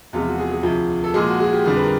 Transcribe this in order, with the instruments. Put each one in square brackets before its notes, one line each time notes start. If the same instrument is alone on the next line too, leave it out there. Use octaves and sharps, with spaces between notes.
[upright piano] E2 C3 F3 G#3 F4
F#4
G#4
G#4
D2 C3 F3
A4
A#2 F3 G#3 G#4
F#4
G#4
G4
F2 D3 G3 G#4
B4
A#4